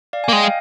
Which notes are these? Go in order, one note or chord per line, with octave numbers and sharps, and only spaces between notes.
D5 F5
G#5
A#3
G#3 D#5 G5
F5